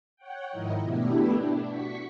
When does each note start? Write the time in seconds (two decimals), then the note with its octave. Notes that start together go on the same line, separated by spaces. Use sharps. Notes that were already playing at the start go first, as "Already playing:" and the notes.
0.16 C#5 F#5 G5
0.51 G#2 D#3 F3 E4 A#4 D#5
0.81 B2 A3 B3 D4 E4 G4
1.38 D4
1.68 F#4 C#6 B6